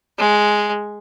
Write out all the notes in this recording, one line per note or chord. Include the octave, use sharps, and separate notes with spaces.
G#3